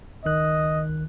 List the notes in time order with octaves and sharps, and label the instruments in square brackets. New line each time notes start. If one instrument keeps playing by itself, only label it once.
[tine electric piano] C#2 D#3 F#6 [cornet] D#5